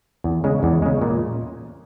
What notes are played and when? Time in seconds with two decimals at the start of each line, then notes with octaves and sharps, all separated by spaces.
0.24 E2
0.44 C#3 G#3
0.63 E2
0.82 C#3 G#3
1.02 A#2